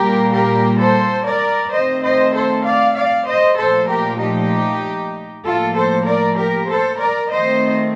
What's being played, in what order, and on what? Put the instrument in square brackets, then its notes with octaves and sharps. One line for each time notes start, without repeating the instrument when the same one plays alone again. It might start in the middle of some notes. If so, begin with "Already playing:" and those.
Already playing: [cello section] A#2 G3 A#3 G4 A#4
G4 A#4
A4 C5
A#4 D5
D#3 A3 C4 C5 D#5
C5 D#5
A4 C5
D5 F5
D5 F5
C5 D#5
A#2 F3 A3 A4 C5
G4 A#4
D#4 G4
A2 F3 A#3 F4 A4
A4 C5
A#4 D5
G4 A#4
A4 C5
A#4 D5
D#3 A3 C4 C5 D#5